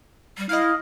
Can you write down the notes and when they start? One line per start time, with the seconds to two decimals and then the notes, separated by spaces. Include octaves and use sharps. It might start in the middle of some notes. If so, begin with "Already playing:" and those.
0.38 G3
0.49 E4 D#5 F5